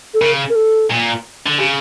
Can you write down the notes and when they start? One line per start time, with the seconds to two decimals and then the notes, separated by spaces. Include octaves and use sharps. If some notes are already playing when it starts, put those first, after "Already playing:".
0.14 A4
0.21 C#3 A#4
0.49 A#4
0.55 A4
0.90 A#2
1.46 D3
1.58 C#3 G4